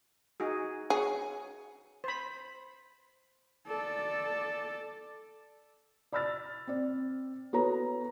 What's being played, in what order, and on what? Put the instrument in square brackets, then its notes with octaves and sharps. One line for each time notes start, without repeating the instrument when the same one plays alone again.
[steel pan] D#4 F#4 G#4
[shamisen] G#4 [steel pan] C#5
[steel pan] C5 B5
[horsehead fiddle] A4 D5
[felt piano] D5 B5 E6 F6 A6
C4 D5
B3 F#4 A4 B4 C#5 A#5